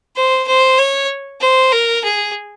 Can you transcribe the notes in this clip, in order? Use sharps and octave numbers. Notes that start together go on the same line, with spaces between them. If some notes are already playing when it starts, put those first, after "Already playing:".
C5
C5
C#5
C5
A#4
G#4